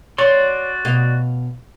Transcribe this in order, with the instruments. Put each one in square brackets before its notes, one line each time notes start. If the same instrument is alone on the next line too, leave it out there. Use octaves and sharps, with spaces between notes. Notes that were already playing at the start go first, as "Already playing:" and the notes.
[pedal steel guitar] F#4 D5 C6 [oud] C#5
[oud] B2 D#5 F5